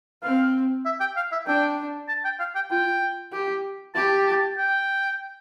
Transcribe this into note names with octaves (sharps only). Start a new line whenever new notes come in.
C4 F5
E5
G5
F5
E5
D4 G5
A5
G5
F5
G5
F4 G5
G4
G4 A5
A5
G5